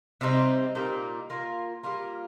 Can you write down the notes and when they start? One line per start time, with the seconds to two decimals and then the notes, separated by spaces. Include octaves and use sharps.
0.21 C3 G3 C4 D#4
0.75 A#2 G3 A#3 D#4
1.30 A#3 F4 A#4
1.83 G3 A#3 F4 A#4